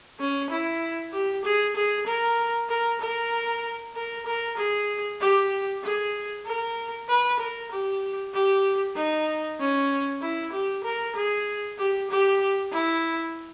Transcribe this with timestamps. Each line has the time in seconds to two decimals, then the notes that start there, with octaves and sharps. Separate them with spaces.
0.20 C#4
0.50 E4
1.13 G4
1.45 G#4
1.77 G#4
2.07 A#4
2.69 A#4
3.01 A#4
3.96 A#4
4.26 A#4
4.57 G#4
5.20 G4
5.84 G#4
6.46 A#4
7.09 B4
7.39 A#4
7.72 G4
8.34 G4
8.96 D#4
9.60 C#4
10.21 E4
10.53 G4
10.84 A#4
11.16 G#4
11.79 G4
12.10 G4
12.72 E4